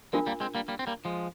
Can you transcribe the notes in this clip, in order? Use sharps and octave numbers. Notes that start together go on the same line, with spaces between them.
F3 G#3 D4 F4 A#4
G3 A#3
G#3 C4
G3 A#3
G3 A#3
C4
G3 A#3
F3 G#3